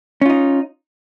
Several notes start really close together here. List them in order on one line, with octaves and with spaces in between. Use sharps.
C#4 F4 D#4